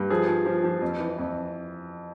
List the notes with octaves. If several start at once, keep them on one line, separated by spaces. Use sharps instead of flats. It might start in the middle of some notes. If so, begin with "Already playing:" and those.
Already playing: G2
F3 G#4
F3
F3
F3
F2
E3
F2